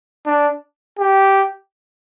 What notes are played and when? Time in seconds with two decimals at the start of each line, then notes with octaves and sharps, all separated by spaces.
0.26 D4
0.99 G4